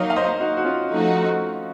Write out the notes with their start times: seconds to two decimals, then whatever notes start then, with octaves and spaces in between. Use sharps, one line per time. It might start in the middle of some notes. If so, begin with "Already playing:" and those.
Already playing: F#3 A#3 D#4 C#5 F5
0.10 F5
0.16 C5 D#5
0.40 D#4 F#4
0.57 F#4
0.64 C#4 F4
0.90 F3 A3 D#4 F#4